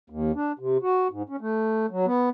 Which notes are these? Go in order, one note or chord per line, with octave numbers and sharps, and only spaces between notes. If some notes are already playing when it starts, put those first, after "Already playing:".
D#2
D4
C3
F#4
G#2
C#4
A3
F#3
B3